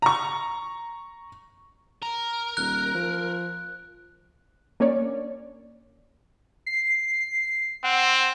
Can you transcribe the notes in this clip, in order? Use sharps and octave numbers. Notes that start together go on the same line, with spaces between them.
A#5 C#6
A#4
D#1 F#6
F3
A#3 C#4 D4 C#5 D5
C7
C4 F#5